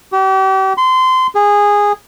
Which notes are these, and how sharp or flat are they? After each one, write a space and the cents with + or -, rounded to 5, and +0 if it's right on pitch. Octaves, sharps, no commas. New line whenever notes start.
G4 -40
C6 -25
G#4 -15